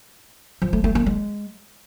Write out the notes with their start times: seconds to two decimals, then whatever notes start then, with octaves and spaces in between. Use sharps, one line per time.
0.62 F3
0.73 A3
0.84 A3
0.95 A#3
1.06 G#3